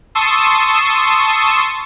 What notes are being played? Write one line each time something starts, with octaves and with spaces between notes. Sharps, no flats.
A5 C6 C#6 D#6 E6